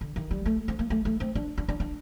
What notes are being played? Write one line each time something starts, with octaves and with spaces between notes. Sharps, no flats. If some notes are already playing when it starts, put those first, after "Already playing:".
D3
D#3
G3
A3
C4
A#3
A3
A3
C4
D4
D4
D4
D4